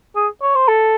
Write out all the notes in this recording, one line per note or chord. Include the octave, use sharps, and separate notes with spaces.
G#4
C#5
C5
A4